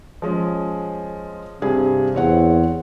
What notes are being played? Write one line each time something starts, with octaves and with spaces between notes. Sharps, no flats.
F3 G#3 C#4
G2 C3 G#4
E2 C4 C#5 F#5